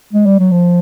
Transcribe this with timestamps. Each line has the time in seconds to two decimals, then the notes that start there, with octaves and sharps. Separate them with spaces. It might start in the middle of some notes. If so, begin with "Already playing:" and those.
0.13 G#3
0.26 G3
0.39 F#3
0.51 F3